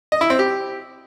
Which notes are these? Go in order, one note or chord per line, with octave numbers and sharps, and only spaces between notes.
D#5
E4
C4
G4